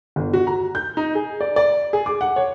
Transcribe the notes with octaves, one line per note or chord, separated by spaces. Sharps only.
G1
F#4
A#5
G6
D#4
G#4
D5
D5
G#4
D6
F#5
C#5